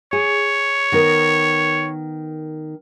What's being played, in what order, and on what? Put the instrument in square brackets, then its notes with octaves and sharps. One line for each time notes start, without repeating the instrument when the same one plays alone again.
[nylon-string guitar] G#4 [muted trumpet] C#5
[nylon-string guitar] D#3 B3 A#4